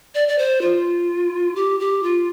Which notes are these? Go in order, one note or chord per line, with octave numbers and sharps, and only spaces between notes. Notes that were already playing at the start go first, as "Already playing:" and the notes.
D5
D5
C5
F4
G4
G4
F4